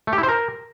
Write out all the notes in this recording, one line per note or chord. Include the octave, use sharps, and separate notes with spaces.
A3
G4
E4
C5
A#4